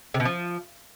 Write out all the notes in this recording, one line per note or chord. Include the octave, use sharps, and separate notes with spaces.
C3
B2
F3